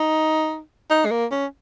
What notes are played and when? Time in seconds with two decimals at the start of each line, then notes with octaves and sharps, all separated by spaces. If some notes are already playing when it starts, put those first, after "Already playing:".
Already playing: D#4
0.90 D#4
1.05 G#3
1.11 A#3
1.31 C#4